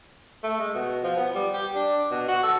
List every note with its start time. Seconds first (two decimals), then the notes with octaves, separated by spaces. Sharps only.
0.44 A3
0.59 G#3
0.75 B2
1.03 F3
1.17 B3
1.35 G3
1.54 G4
1.75 D4
2.11 B2
2.28 F#4
2.43 A4